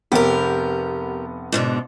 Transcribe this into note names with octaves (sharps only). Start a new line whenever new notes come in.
F1 B3 G4 A#4
G#2 B2 D3